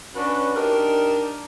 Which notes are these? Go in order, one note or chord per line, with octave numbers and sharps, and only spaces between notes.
C#4 D4 F#4 B4
D4 D#4 G4 A#4